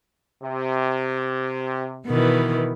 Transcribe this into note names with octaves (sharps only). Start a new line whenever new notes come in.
C3
B2 D#3 E3